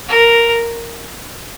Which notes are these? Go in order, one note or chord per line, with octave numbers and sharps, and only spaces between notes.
A#4